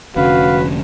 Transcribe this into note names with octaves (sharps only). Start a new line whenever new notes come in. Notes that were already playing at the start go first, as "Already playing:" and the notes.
F1 D3 C#4 F#4 B4 F5